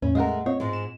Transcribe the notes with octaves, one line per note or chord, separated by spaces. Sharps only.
E2 A2 E3 C#4
G#3 A3 A#4 D#5 F5 F#5
C4 F4 C#5 D#5
G#2 G#3
E7